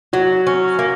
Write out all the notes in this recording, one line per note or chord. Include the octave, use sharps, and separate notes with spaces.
F#3 F#4
C#4
A#3